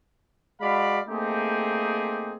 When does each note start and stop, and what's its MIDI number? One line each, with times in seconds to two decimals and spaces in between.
0.61 0.99 56
0.61 0.99 66
0.61 0.99 74
0.61 0.99 77
0.61 0.99 83
1.08 2.36 57
1.08 2.36 58
1.08 2.36 60
1.08 2.36 63
1.08 2.36 67
1.08 2.36 68